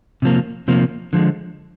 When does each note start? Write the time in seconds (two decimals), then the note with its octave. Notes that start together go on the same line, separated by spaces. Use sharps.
0.22 C3 F3 A#3
0.68 C3 F3 A#3
1.13 D3 F3 G#3